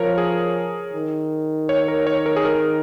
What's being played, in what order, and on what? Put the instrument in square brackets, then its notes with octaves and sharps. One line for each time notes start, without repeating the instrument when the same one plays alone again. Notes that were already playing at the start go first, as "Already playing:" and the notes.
Already playing: [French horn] F3 [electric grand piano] A#4 C#5
[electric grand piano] G#4
[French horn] D#3
[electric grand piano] C#5
A#4
C#5
A#4
G#4
A#4